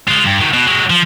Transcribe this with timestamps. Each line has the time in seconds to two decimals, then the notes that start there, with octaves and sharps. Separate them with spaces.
0.08 G#3 F4
0.26 G2
0.40 D#3 F#3
0.53 B2
0.66 F#3 G#3
0.90 F3